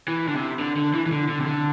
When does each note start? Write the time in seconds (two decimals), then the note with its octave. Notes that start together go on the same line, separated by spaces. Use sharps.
0.08 E3
0.28 D3
0.35 C3
0.60 D3
0.77 D3
0.94 E3
1.06 E3
1.12 D3
1.29 D3
1.40 C3
1.46 D3